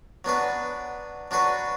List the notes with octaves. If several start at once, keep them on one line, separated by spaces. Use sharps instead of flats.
F#3 B3 D4 B4
F#3 D4 F#4 B4